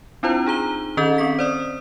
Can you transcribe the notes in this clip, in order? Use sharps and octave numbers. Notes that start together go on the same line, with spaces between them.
C4 D4 E4 F4 C5 A#5
D#4 G#4 A#5 G7
D#3 C#4 A4 D#5 G6
C4 C#6 B6
C5 D5 D#6